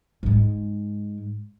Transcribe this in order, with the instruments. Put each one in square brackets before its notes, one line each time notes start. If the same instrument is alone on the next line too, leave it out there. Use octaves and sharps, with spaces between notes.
[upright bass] G#2 G#3